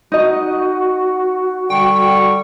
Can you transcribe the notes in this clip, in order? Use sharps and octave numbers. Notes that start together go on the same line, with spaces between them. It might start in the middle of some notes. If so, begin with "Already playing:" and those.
D#4 F#4 D#5
D3 G3 G5 C#6